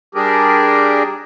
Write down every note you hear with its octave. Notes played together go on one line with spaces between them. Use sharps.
G3 D4 G4 G#4 A#4